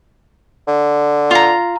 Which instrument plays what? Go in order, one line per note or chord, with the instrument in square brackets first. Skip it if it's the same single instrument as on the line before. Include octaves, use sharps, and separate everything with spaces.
[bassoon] D3
[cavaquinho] F4 A#5